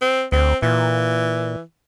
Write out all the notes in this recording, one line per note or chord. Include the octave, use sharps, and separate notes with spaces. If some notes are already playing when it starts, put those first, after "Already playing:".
C4
D2 C4
A#2 E3